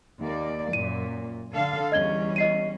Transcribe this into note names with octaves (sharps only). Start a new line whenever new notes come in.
D#2 A#3 D5
F#2 A#2 D#7
D3 A4 F5
E2 G3 C#4 D#5 G#6 G7
D#5 C7 D#7